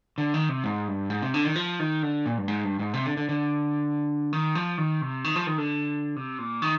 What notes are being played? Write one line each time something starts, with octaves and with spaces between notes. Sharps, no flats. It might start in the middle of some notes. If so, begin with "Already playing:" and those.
D3
D#3
C3
G#2
G2
G#2
C3
D3
D#3
F3
D#3
D3
A#2
G2
G#2
G2
G#2
C3
D3
D3
D3
D#3
F3
D#3
C3
D#3
F3
D#3
D3
C3
A#2
D#3